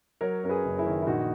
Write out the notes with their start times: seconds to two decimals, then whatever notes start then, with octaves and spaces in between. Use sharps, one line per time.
0.21 F#3 A#4 C#5
0.43 F#2 A#4
0.49 G#4 B4
0.65 F#1
0.78 E4 G#4
0.86 D#3
1.02 E4
1.07 A#1 D#4 F#4